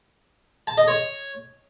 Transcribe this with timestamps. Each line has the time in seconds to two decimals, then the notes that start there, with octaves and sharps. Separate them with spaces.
0.67 A5
0.78 D#5
0.88 C#5